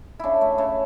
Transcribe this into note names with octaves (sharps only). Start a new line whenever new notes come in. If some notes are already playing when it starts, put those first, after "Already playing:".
C#3 D4 E4
A3
C#3